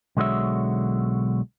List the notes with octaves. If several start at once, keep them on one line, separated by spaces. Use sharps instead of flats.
B1 D3 G#3 F#4 C#5 E5